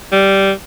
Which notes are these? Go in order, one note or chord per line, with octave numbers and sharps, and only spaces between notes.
G3